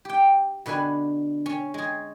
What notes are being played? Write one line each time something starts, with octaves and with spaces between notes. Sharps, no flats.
G4 G5
B2 D3 B4 G#5
C#4
G#3 G#4